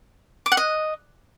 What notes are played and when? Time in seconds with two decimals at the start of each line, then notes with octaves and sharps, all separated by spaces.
0.46 D6
0.52 F#5
0.57 D#5